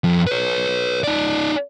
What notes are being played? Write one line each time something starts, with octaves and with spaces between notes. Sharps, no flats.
F2
B4 C#5
D#4 D5